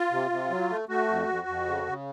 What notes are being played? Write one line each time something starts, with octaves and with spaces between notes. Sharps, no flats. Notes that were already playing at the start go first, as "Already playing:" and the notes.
Already playing: F4
C3
C3
F#3
A3
A3 F#4
F2
F2
F2
C#3
C#3